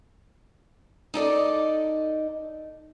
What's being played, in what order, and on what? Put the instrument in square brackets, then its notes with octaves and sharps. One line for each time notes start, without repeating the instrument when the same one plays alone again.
[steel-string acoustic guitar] D#4 A4 D5 D#5